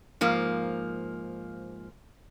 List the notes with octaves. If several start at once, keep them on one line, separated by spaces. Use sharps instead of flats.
G#2 F3 A#3